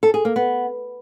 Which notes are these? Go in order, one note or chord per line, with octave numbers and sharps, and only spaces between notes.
A4
G#4
A#3
B3